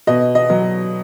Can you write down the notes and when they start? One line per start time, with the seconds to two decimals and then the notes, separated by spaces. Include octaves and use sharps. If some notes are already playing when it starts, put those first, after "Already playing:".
0.07 B2 D#5
0.35 D#5
0.50 F#3